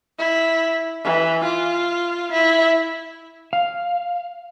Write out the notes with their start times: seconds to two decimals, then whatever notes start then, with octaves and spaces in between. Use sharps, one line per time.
0.19 E4
1.04 E3
1.44 F4
2.31 E4
3.53 F5